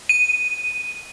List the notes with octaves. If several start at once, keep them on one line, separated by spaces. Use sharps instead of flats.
D#7